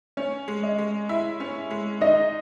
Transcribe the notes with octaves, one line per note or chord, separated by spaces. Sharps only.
C#4 C#5
G#3
D#5
G#3
E4 E5
C#4
G#3
D#4 D#5